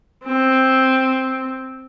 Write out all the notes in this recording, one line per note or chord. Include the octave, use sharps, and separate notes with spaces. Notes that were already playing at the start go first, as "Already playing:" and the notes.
C4